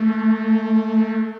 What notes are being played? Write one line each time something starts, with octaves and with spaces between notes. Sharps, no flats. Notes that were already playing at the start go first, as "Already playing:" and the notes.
Already playing: A3